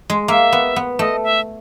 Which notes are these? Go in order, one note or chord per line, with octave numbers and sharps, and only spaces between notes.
G#3
A#3 E5
B3
B3
A3 D#5
E5